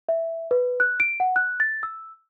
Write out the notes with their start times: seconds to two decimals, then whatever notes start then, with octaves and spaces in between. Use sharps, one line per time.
0.09 E5
0.51 B4
0.80 F#6
1.00 D7
1.20 F#5
1.36 F#6
1.60 A6
1.83 E6